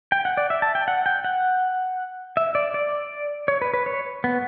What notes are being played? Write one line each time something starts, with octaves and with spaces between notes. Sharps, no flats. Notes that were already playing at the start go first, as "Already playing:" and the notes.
G5
F#5
D5
E5
A5
G5
F#5
G5
F#5
E5
D5
D5
C#5
B4
B4
C#5
B3